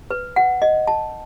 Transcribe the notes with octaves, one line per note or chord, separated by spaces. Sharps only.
B4
F#5
D#5
A5